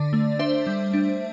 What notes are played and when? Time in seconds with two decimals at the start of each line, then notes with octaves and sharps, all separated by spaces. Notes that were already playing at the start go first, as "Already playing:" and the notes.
Already playing: D3 D4 D5
0.13 A3
0.39 D4 C5 E5
0.67 G3
0.93 D4